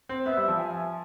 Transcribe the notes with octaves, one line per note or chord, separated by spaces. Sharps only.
C4
B3 E5
G3
F3
G#5